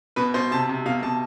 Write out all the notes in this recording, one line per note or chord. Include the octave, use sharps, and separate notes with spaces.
B2 B4
B2 C5
C3 A5
C3
B2 F5
B2 A5